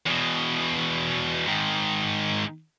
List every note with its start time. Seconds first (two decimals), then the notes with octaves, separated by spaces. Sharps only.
0.06 E2 B2
1.47 G#2 D#3